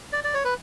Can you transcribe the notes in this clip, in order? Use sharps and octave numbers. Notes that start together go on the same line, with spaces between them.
D5
D5
C#5
B4